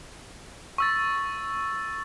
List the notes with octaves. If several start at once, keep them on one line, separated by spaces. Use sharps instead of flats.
C#6 E6 A6